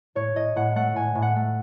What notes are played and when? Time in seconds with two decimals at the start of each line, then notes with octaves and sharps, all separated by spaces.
0.15 A2 C#5
0.36 A2 D#5
0.56 A2 F#5
0.76 A3 F#5
0.95 A2 G#5
1.15 A2
1.22 F#5
1.36 A3